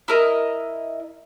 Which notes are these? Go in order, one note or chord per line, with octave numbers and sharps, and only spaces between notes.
E4 A#4 D#5